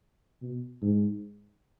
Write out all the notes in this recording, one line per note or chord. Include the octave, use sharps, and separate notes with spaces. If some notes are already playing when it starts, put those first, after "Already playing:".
B2
G#2